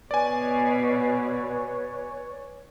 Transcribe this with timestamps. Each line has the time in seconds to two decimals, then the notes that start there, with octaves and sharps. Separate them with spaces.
0.11 B2 B4 C#5 D5 G#5